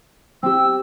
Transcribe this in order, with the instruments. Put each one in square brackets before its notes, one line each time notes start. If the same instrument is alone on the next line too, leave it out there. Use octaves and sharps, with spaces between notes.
[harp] C4 G4 [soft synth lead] G5 [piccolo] E6